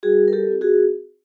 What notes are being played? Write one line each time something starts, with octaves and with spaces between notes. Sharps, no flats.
G3 F#4 G#4
A#4
G4 A4
C4 F4
F#4 G#4